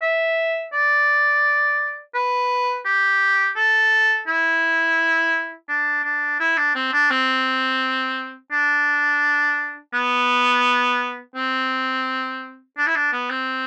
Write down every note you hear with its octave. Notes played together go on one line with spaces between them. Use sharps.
E5
D5
B4
G4
A4
E4
D4
D4
E4
D4
C4
D4
C4
D4
B3
C4
D4
E4
D4
B3
C4